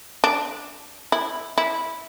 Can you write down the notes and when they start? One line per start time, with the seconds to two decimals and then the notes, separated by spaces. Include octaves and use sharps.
0.24 D4
1.12 E4
1.58 E4